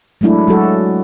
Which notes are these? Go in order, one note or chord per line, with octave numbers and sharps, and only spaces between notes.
F#3 G#3 A3 D4 E4
F#3 G#3 F#4 A4